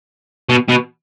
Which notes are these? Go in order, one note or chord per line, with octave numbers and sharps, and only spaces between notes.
B2
B2